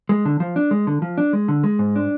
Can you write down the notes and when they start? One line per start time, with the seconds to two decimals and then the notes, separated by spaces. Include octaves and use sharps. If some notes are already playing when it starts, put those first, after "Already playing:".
0.09 G#3
0.25 D3
0.40 F3
0.56 D4
0.71 G#3
0.87 D3
1.02 F3
1.18 D4
1.33 G#3
1.48 D3
1.64 G#3
1.79 G#2
1.96 D4